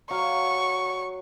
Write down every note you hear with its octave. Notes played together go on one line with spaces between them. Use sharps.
F#3 F5 C#6